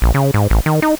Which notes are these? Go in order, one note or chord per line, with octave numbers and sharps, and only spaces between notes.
A#1
C#3
G#2
A1
D#3
D#4